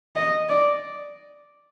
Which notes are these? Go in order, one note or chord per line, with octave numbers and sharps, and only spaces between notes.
D#5
D5